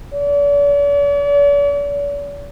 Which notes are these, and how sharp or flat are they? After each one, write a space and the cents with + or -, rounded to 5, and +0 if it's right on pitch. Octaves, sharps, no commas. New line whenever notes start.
D5 -45